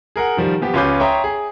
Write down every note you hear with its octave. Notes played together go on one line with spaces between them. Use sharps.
G#4 A#4 F#5
D#3 F3 G3
F3 B3 G4
C#2 C#4 F4 B4 D6 G6
C#5 E5 G5 A#5 C6 D#6
G#4